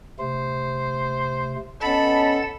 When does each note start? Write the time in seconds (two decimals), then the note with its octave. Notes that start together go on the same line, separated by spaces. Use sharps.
0.20 C3 A3 C5
1.82 B3 C#4 A4 D#5 F#5 A5 B5 A6